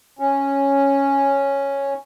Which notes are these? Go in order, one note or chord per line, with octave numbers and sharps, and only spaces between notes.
C#4